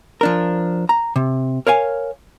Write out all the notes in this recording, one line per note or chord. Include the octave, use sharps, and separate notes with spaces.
F3 D4 A#4
A#5
C3
A#4 C#5 F5 G#5